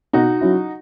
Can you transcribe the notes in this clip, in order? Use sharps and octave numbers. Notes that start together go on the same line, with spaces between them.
B2 D#4 F#4
F#3 C#4 E4